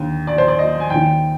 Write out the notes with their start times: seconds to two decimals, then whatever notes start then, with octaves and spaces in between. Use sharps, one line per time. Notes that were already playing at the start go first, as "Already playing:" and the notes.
Already playing: D#2 D3
0.27 D5
0.38 C5
0.48 D5
0.59 D#5
0.80 G#5
0.90 D#2 D#3 G5